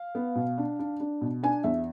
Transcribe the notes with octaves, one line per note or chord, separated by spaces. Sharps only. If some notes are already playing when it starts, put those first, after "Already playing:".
Already playing: F5
B3
B2
D4
D4
D4
B2
D4 G#5
E2 E5